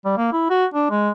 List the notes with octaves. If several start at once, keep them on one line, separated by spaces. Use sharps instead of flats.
G3
A#3
E4
F#4
D4
G#3